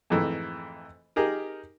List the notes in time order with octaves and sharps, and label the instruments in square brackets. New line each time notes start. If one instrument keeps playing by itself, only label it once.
[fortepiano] F2 G#2 E3 A3
D#4 G4 G#4 A#4